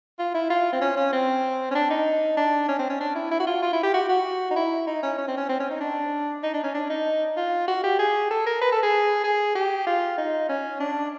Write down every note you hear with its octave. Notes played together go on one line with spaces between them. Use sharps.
F4
E4
F4
C4
C#4
C#4
C4
C#4
D4
D#4
D4
C#4
C4
C#4
D4
E4
E4
F#4
F4
F4
E4
G4
F#4
F#4
D#4
E4
D#4
C#4
C#4
C4
C#4
C4
C#4
D#4
D4
D#4
D4
C#4
D4
D#4
F4
F#4
G4
G#4
A4
A#4
B4
A4
G#4
G#4
G4
F4
D#4
C#4
D4